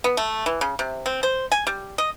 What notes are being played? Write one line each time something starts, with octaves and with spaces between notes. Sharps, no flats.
B3
A3
E3
C#3
C3
C4
C5
G#5
G3
D#5